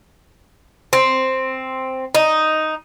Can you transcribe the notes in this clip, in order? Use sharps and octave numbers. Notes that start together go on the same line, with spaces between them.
C4
D#4